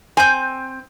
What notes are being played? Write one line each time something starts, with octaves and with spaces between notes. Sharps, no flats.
C4 G#5 G6